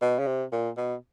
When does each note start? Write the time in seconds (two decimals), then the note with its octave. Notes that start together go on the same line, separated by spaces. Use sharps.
0.01 B2
0.19 C#3
0.27 C3
0.52 A#2
0.77 B2